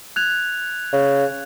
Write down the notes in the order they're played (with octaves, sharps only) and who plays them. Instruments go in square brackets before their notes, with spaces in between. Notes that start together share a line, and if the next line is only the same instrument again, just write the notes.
[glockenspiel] F#6 G#6 F7
[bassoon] C#3